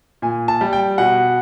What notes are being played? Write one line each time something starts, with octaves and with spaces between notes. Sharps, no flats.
A#2 G#5
A5
G3
G5
B2 F#5